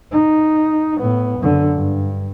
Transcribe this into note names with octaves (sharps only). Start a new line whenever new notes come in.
D#4
A2 B3
F#2 D3
G2